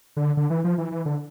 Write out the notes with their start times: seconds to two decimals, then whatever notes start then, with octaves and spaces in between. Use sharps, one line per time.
0.17 D3
0.37 D3
0.50 E3
0.64 F3
0.78 E3
0.92 E3
1.06 D3